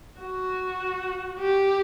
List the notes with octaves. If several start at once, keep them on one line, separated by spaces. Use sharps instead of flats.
F#4
G4